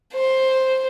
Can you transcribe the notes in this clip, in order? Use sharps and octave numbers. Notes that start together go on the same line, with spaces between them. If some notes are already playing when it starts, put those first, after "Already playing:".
C5